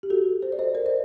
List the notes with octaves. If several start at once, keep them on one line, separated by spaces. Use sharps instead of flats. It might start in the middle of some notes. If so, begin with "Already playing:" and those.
G4
F#4 A4
A4 C5
D5
C5 D#5
A#4 D5
C5 D#5